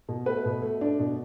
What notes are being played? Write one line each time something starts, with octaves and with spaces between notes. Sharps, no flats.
B2
A3 B4
B2
A3
D4
B2